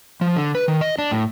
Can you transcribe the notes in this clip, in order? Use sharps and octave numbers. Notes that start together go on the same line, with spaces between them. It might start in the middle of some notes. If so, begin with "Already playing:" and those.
F3
D3
B4
D#3
D#5
D4
A2